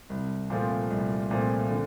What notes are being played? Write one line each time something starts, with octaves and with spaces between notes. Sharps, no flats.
C2
A#2 F3 A3 C4
C2
A#2 F3 A3 C4
D3